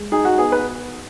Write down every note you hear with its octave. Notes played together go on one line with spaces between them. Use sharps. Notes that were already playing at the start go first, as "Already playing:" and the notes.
Already playing: G#3
D#4 G#4
F#4
B3 G#4
B4